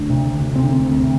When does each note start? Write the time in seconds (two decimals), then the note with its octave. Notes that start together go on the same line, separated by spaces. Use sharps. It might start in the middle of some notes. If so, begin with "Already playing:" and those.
Already playing: D2 D4
0.10 C3
0.33 D2
0.56 C3 C4
0.64 D4
0.72 C4
0.80 D2
1.03 C3